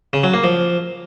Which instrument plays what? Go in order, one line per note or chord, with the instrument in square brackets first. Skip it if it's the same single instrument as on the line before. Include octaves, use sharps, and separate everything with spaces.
[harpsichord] C#3
F#3
A#3
F3